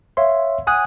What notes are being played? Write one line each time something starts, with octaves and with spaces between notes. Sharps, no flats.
C#5 E5 F5 C6
F#5 G#5 D#6 F#6